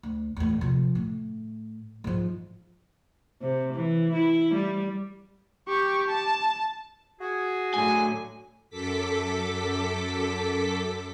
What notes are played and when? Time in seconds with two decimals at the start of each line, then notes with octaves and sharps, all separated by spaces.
0.03 D2
0.37 E2 A2
0.61 C3 F3
0.95 A2
2.04 G#2 F3
3.41 C3
3.74 E3
4.13 E4
4.54 G3
5.68 G4 C#6
6.08 A5
7.20 F#4 G#4
7.74 A2 D3 F#3 G#5
8.70 F#2 A4 D6 B6